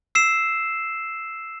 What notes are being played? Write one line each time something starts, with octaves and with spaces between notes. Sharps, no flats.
E6 C7 E7